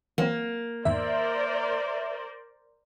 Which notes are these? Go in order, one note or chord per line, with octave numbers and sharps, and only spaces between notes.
E3 F#3 A#3 C4
E2 G#2 D#3 A#4 C5 D5 E5